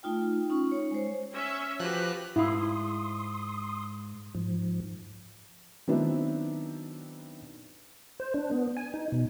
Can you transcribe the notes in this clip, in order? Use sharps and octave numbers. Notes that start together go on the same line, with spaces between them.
A3 D#4 F4 G5
C#4 D#4 F4 C#6
C#5
G#3 C5
C#4 E5
F3 F#4 G4 B4 F#6
G#2 E4 F5 C6 D#6
G#2 F3
D#3 F#3 B3 C4 D4 E4
C5
D4
B3
G#5
D#4
B2